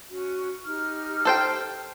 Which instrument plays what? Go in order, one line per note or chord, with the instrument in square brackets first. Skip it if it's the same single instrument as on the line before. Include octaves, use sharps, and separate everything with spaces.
[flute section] C#4 F#4
D#4 G4 F6
[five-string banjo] A4 C5 G5